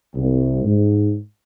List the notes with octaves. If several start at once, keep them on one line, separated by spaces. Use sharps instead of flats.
C2
G#2